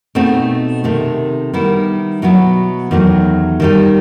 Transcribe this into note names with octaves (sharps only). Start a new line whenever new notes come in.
B2 A3 C4 D#4
C3 D#3 A3
D#3 G3 B3 E4
B2 F#3 B3 E4
E2 D#3 F#3 A3
D#3 G3 D#4